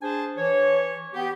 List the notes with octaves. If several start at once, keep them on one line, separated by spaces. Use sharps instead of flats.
D4 G#4 C5 G#5 A5
E3 C#5
B3 G4